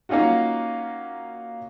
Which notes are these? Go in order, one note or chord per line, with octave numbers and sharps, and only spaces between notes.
A#3 C#4 D#4 F4 F#4